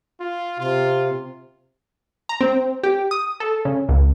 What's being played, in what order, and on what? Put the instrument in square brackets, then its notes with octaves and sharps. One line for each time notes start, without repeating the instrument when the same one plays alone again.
[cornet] F4
[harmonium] C3 [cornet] F4
[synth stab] A#5
C4
G4
D#6
A4
C#3
C#2